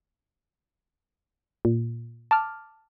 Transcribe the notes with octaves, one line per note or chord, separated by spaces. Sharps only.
A#2
A5 D6 F6